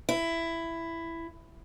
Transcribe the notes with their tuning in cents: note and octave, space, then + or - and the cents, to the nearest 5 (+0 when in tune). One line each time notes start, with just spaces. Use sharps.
E4 +10